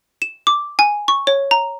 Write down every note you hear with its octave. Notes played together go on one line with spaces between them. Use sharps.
E7
D6
G#5
C#6
C#5
A#5